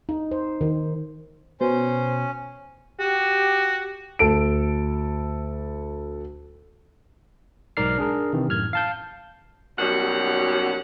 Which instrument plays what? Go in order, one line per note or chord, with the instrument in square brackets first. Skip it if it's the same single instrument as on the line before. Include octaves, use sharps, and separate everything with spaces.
[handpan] D#4
C5
D#3
[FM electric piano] B2 [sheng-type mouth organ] C#4 [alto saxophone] C5
[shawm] F#4 [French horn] G4
[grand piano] D2 A4 D7
[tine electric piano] B1 G#2 A#4 D5 F6 C7
D4 G#4 A#4
C3 D#3 E3
F#2 A2 F6 G#6
F5 A5 G6
[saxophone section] D#2 B2 F#3 G3 C#4 F#5